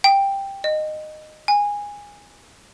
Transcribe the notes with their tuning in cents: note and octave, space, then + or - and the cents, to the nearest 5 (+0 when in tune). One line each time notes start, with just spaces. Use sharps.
G5 +10
D#5 -15
G#5 -15